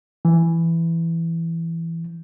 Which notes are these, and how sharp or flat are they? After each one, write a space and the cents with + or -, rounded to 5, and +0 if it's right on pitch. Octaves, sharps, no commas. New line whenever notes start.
E3 +10